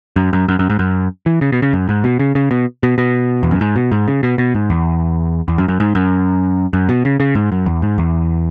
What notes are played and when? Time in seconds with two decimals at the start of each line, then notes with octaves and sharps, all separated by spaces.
0.16 F#2
0.33 F#2
0.48 F#2
0.59 F#2
0.70 G#2
0.79 F#2
1.26 E3
1.41 C#3
1.52 B2
1.62 C#3
1.73 F#2
1.89 G#2
2.04 B2
2.19 C#3
2.35 C#3
2.51 B2
2.83 B2
2.98 B2
3.43 E2
3.51 F#2
3.61 G#2
3.76 B2
3.92 G#2
4.08 C#3
4.23 B2
4.38 B2
4.54 G#2
4.70 E2
5.48 E2
5.58 F#2
5.68 F#2
5.80 G#2
5.95 F#2
6.73 F#2
6.89 B2
7.05 C#3
7.20 C#3
7.35 G#2
7.52 F#2
7.66 E2
7.82 G#2
7.98 E2